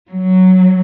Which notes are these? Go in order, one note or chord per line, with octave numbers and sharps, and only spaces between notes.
F#3